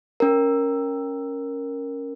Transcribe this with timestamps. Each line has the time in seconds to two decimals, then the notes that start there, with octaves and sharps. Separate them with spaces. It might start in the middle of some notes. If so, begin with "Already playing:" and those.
0.20 C#4 A#4